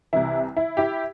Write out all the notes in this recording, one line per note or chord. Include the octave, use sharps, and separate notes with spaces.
C2 C3 E3 E4
E4
E4 G4